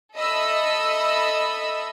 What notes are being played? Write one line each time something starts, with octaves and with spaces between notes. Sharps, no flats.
A4 D#5 E5 B5 E6